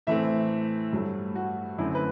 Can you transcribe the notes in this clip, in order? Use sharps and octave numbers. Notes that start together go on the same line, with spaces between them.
A2 E3 A3 C4 E5
G2 F#3 A3
F#4
F#2 D3 A3 C4 E4
B4